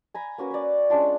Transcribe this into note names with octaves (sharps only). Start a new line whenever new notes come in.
G#5 A#5 B5
A#3 C#4 F#4 B4
B4 D5
G#3 C#4 D4 F4